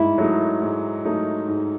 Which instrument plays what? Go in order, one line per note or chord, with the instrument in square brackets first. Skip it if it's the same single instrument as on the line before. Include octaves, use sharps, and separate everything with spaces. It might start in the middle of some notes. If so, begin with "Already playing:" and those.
Already playing: [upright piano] G#2 [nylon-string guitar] E4
[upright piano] F#3 A3 D#4
G#2
F#3 A3 D#4
G#2